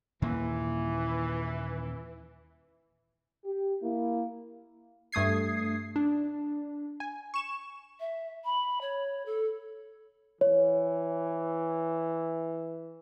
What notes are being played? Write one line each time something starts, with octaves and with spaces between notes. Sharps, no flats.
D#2 A#2 E3 A#3
G4
A#3 E4
G2 A3 D#6 G#6 C7
D4
G#5
C#6 E7
E5
B5
C#5
A4
E3 C#5